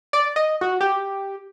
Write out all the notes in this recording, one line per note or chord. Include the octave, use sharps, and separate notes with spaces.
D5
D#5
F#4
G4